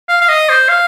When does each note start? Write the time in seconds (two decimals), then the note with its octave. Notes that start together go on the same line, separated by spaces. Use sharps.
0.09 F5
0.21 F5
0.29 D#5
0.49 C5
0.68 F5